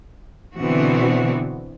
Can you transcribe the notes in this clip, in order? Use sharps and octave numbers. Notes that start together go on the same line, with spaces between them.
B2 D3 E3 B3 C4 F#4